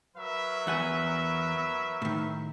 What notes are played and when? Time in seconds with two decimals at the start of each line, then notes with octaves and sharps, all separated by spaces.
0.17 F#3 A#4 B4 E5
0.67 E2 F#5 G#5
2.02 A2 D#3